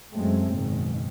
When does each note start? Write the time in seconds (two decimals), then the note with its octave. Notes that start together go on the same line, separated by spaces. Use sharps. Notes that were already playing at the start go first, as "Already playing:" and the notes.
0.13 F#2 F#3 G#3 A3 C4
0.51 F#1 G#2 B2 D#3